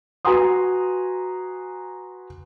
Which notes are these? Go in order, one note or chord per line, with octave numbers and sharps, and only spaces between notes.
F#4 B4 G#5 A#5 C6 D#6